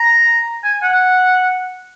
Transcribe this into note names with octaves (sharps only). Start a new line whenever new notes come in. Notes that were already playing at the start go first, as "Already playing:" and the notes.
Already playing: A#5
G#5
F#5